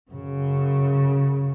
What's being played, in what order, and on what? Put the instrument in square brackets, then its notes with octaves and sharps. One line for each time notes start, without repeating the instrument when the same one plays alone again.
[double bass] F#2 C#3